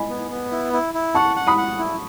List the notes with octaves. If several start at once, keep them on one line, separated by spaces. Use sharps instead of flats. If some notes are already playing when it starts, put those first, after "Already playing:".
Already playing: D#5 G#5 B5
B3
B3
E4
E4
E4
F#5 A5 C#6
F#5
B5 D#6
F#5
E4